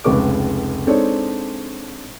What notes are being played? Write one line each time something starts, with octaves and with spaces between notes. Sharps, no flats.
F1 C#2 G#3 B4 C#6 D6
G#3 C4 D4 D#4 A4 C#5